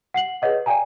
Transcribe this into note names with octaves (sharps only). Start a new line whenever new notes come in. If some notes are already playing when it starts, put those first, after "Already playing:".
F#5 C7 F#7
G#4 B4 C#5 D#5 F#5
D5 F5 G5 G#5 A#5